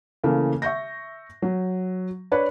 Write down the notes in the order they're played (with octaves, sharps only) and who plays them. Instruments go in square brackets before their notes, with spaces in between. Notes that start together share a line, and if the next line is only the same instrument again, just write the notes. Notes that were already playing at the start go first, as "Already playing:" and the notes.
[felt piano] C#3 E3 A3 A#3
E5 C#6 G6 A#6
F#3
D4 B4 C#5 D5